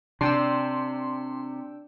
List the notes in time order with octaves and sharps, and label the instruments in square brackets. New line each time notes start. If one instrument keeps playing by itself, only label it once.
[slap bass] C3 [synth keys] D4 G5 E6 [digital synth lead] C6